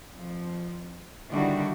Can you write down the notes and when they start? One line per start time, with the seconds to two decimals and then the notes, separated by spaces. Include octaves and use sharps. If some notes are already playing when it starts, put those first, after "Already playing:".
0.14 F2 F3
1.31 D3 D#3 G3 D4 E4 F#4